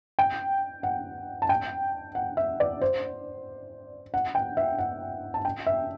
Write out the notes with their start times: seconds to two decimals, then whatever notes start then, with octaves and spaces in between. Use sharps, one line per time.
0.19 G5
0.83 F#5
1.42 A5
1.49 G5
2.15 F#5
2.37 E5
2.60 D5
2.82 C5
4.14 F#5
4.35 G5
4.57 E5
4.78 F#5
5.34 A5
5.45 G5
5.67 E5